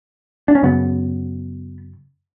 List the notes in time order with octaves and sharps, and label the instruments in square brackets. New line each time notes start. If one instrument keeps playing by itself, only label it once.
[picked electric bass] D4
C#4
F#2 C#3 B3